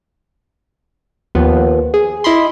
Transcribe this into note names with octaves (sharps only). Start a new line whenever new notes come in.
D#2 F3 B3
G#4
E4 D#5 B5 C6